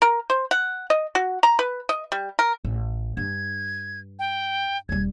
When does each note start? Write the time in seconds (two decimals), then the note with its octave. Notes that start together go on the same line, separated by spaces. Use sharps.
0.02 A#4
0.30 C5
0.51 F#5
0.90 D#5
1.15 F#4
1.43 A#5
1.59 B4
1.89 D#5
2.12 G3
2.39 A#4
2.65 A1
3.17 G2 G#6
4.19 G5
4.89 E1 G3 G#6